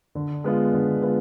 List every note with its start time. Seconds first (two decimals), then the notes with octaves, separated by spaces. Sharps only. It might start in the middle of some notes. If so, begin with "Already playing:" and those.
0.15 D3
0.44 G#3 B3 F4
0.73 D3
1.02 G#3 B3 F4